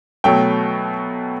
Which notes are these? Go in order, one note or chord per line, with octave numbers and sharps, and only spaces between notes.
B2 F#3 A3 G5